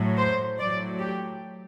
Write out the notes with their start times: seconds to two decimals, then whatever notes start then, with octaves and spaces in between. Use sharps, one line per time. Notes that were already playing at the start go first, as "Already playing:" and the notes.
Already playing: A2 F#3
0.18 C5
0.58 A2 F#3 D5
0.99 G4